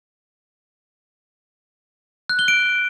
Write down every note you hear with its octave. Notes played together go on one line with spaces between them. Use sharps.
F#6
G7
D7